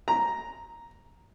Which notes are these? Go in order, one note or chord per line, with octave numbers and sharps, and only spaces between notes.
A#5